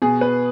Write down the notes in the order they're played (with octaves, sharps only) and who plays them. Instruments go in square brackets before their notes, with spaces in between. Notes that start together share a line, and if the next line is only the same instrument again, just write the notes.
[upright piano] B2 G#4
B4